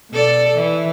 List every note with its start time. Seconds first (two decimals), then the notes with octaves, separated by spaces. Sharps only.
0.11 B2 A4 D5
0.55 E3